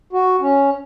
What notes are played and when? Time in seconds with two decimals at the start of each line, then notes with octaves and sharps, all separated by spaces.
0.13 F#4
0.41 C#4